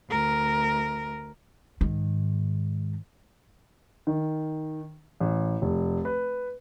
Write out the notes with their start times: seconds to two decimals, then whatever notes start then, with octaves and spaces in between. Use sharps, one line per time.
0.11 D2 A#4
1.81 G#2 D#3
4.07 D#3
5.20 A1
5.62 F1
6.05 B4